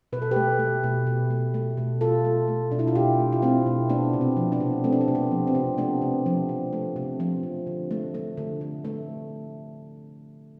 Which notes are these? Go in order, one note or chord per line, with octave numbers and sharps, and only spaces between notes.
B2 B4
A4
A3 G4 B4
A3
B2
B2
A3
A3
B2
B2 F4 A4
A3
A3
B2 D4
E4
F4
B2 E4 G4
A3
F4
A3 C4 E4
B2
A3 B3 D4
C3
C4
F3
B3 D4
C3
A3 C4
D4
C4
C3
B3
F3
C4
C3
A3 B3 D4
C3
F3
C3
A3
C3
F3
C3
D3
A3
A3
D3
D3
A3